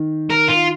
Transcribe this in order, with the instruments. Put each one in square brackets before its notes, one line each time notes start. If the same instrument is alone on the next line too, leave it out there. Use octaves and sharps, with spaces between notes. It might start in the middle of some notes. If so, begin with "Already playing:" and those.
Already playing: [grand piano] D#3
[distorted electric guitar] A#4
F4